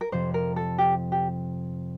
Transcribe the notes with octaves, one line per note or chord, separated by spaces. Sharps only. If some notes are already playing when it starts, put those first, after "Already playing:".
A#4
F2 C3 F3 C5
A#4
A4
G4
G4